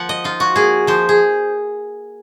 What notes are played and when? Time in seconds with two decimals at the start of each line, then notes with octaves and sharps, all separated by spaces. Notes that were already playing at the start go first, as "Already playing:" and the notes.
Already playing: F3 A#3 F#5
0.09 D#5
0.24 D#4 F4
0.40 F#4
0.56 A#3 G#4
0.87 F3 C5
1.09 G#4